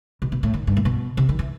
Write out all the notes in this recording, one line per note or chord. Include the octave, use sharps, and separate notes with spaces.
B2
B2
A2
D#3
G2
A2
B2
C3
D#3
E3